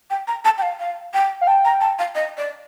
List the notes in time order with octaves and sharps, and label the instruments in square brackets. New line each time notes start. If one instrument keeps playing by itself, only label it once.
[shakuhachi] G5
A#5
A5
G5
F5
F5
G5
[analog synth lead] F5
[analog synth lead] G5 [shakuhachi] A5
[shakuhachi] A#5
A5
F5
D#5
D5